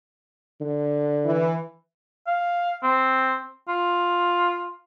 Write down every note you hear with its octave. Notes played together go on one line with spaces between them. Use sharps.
D3
E3
F5
C4
F4